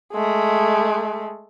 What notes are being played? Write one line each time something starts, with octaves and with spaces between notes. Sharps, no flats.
G#3 A3